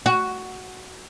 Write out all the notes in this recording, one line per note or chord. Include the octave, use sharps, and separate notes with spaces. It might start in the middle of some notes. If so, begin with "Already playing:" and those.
F#4